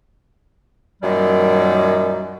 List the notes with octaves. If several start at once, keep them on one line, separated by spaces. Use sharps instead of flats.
F#2 A#2 D#3 F#3 G3